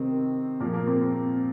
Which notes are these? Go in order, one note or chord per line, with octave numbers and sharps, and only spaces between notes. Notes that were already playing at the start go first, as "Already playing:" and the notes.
Already playing: C3 D#3 C4
A#2 F3 A#3
A#3
C4
C4